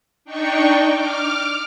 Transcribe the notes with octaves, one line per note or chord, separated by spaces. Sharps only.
D4 D#4 G5 C#6
D6 F6